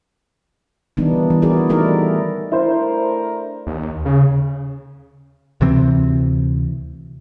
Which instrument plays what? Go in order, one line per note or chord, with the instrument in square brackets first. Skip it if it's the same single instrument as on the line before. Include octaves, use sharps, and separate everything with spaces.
[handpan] D#3 E3 G3 B3 D4 D#4
E3
E4 F#4 G#4 A#4 D5
G3 A3 D#4 E4 A#4 D5
[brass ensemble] A3 D4 A#4 [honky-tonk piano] E4 C5
[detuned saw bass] D#2
C#3
[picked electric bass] D2 C3 E3 C4